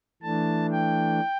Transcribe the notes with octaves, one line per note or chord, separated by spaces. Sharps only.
E3 A3 D4 A5
G5